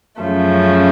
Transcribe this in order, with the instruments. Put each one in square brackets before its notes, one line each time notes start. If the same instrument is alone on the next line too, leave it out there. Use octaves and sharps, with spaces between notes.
[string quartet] F#2 C#3 F3 A3